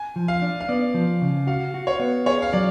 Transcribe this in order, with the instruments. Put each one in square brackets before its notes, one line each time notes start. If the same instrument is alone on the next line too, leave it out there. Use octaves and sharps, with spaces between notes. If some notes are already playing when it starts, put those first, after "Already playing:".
Already playing: [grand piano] G#5
[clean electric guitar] F3
[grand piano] F5
[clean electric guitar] D4
[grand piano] F5
[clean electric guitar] B3 [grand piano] D5
[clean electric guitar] F3
C#3
[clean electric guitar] F#4 [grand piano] F5
[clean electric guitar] F#4
[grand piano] C#5
[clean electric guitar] B3
[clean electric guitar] G#4 [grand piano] C#5
[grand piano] F5
[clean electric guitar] F#3 [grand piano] D5